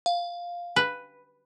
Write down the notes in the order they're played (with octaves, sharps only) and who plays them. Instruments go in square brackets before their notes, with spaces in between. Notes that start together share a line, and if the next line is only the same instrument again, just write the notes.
[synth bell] F5
[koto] B4